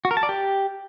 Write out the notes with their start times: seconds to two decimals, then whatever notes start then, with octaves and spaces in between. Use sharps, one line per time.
0.05 F#4
0.11 A#4
0.17 A5
0.23 D5
0.29 G4